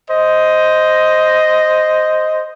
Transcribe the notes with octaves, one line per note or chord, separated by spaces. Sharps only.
C5 D#5